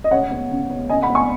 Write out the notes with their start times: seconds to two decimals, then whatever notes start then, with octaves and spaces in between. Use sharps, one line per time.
0.04 D#5
0.11 C#3 C#5 F#5
0.31 B3
0.51 C#3
0.69 B3
0.89 C#3 D#5 G#5
1.02 F#5 B5
1.10 B3
1.15 G#5 C#6